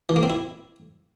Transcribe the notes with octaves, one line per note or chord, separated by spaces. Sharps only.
E3
A#3
C4
E4